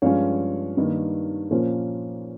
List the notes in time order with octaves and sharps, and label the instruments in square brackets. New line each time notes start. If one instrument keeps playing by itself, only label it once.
[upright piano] G2 F3 G#3 C#4 C#5 F5
G2 D#3 A#3
A#2 F3 A#3 C#4 C5